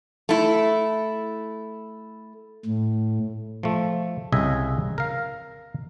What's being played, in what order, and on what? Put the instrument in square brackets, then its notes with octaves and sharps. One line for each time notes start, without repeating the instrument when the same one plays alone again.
[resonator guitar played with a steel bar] A3 E4
[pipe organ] A2
[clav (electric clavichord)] F3 A3
C2 C#3 D#5 E5 G#5
A#4 F5